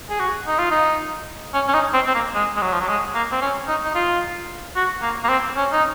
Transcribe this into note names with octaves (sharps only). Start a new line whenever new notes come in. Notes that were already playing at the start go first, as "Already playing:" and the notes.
G#4
F#4
D#4
F4
D#4
C#4
C#4
D#4
C4
C4
A#3
G#3
G#3
F#3
F3
F#3
G#3
A#3
C4
C#4
D#4
D#4
F4
F#4
A#3
A#3
C4
C#4
D#4